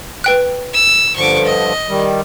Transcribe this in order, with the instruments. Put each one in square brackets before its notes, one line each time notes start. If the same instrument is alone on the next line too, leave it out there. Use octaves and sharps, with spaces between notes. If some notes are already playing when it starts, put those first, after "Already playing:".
[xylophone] B4 G5 F#6
[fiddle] E6
[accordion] G2 D3 F3 [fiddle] C#6 D6
[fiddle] D#5
[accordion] D#3 G3